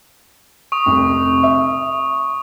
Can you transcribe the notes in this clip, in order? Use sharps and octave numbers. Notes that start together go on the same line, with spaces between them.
C#6 D#6
F1 C2
E5